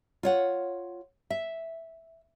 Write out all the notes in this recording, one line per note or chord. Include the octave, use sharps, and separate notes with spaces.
F4 C#5 F#5
E5